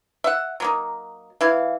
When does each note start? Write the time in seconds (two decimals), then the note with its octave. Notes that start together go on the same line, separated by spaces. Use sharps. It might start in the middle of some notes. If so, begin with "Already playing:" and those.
0.24 E5 F#5
0.60 F#3 A#3 D#4
1.41 E3 E4 F5